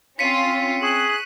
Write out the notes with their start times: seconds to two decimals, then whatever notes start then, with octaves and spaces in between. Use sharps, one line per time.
0.19 C4 C#4 F4 B6 C#7 D#7
0.83 G#4 C#6 F#6